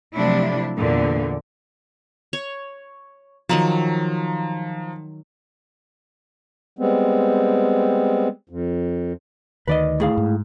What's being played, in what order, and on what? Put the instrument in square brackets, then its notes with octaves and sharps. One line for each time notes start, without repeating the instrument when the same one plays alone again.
[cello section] C3 F3 F#3 A3 D4 E4
E2 A#2 D3
[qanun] C#5
[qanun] D#3 F#3 A5 [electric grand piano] F3 A#5
[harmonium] G3 G#3 B3 C4
F2
[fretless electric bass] D2 D#3 [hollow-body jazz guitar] B4 D5 D#5
[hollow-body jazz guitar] A2 G#4 F5
[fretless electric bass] G#2